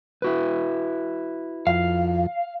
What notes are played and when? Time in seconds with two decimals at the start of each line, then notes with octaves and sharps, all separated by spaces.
0.22 E4 F#4 B4
1.67 F2 F5